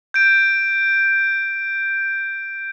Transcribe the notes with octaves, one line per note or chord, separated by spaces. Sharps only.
G6 D7